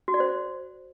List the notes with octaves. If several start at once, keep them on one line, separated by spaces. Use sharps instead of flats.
F#4
D5
C5